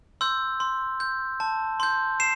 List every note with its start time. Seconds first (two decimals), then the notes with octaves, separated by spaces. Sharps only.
0.21 C6 E6 G6
0.60 C6
1.00 G6
1.40 A5
1.80 C6 G6
2.20 C7 E7